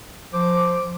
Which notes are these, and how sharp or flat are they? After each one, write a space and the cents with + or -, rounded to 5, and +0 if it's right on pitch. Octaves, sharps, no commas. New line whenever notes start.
F3 +20 C5 +0 D6 +0